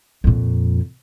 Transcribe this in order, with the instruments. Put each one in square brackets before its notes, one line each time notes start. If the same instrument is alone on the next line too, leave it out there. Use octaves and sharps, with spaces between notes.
[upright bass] F2 A#2